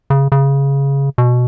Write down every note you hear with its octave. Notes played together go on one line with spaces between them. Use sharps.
C#3
C#3
B2